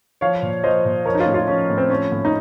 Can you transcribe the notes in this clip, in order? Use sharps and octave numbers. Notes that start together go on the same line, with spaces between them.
F3 C#5 F5
A#2
F3 C5 D#5
A#2
F3 A#4 C#5
D#4
C#4 F4
A2
C#4 F4
F3 C#4
A2
C4
F3 C#4
A2
D#4